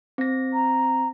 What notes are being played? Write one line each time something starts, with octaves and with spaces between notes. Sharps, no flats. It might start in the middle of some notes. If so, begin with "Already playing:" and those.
C4 A#6
A#5